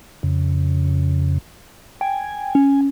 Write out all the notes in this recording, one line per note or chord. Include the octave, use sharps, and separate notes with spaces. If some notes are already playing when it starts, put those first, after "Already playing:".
F2 C#3
G5 G#5
C#4